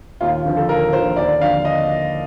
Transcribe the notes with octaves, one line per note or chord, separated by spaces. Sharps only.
D#2 F4
D3 F3
A4
D#2 A#4
D3 F3 C5
D#2 D5
D3 F3 F5
D#5